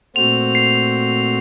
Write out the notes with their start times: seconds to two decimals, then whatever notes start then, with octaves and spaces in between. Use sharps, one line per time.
0.16 A#2 A3 C4 F#4 C5 F7
0.55 C7